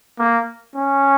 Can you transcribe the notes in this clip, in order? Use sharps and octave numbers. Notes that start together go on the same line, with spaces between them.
A#3
C#4